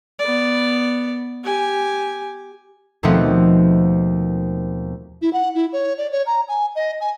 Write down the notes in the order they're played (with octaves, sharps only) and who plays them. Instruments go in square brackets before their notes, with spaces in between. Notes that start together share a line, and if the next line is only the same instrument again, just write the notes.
[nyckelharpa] B3 D5
G4 G#5
[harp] D#2 B2 F3 A3 B3 C4
[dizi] E4
F#5
E4
C#5
D5
C#5
A#5
G#5
D#5
G#5